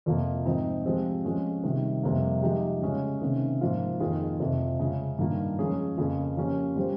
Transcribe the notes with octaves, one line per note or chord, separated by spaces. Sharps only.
F2 C3 F3 A#3
G#2 F3 C4 D#4
F3 G#3 C4 G4
F3 G#3 C#4
C3 D#3 G3
F2 C3 G3 A#3
F3 G#3 D#4 G4
C#3 G#3 C#4
C3 D#3 A#3 C#4
G#2 F3 A#3 F4
F2 D#3 A#3 F4 G#4
F2 C3 F3
C#3 G#3 C#4
G2 D#3 A#3 F4
F3 G#3 C#4 G#4 C#5
F2 C#3 F3 A#3
F3 A#3 C#4 G4
G3 C#4 G4 C5